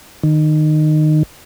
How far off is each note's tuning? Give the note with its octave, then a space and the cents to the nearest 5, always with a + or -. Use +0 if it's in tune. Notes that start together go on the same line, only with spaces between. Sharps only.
D#3 -20